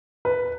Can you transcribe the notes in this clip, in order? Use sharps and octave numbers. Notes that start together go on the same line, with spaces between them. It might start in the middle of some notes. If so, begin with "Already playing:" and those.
B4